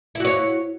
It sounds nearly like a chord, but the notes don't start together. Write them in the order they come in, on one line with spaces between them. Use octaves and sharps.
E4 F#4 C#5